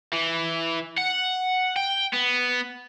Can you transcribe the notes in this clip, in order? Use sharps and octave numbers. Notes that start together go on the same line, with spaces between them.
E3
F#5
G5
B3